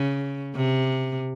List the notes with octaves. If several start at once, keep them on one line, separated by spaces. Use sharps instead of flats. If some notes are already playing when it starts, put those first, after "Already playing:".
Already playing: C#3
C3